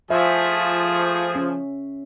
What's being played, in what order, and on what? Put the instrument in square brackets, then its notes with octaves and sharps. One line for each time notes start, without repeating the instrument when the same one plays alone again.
[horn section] F3 [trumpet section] A3 G#4 [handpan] E5
[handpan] C#4